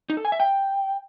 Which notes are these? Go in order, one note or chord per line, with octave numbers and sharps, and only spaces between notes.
D#4
A4
G#5
E5
G5